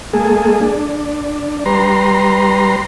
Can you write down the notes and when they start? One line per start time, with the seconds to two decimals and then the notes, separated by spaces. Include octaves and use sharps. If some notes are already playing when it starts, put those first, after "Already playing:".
0.13 G#3 A#3 G#4 A4
0.61 D4
1.66 G3 B4 A#5 C6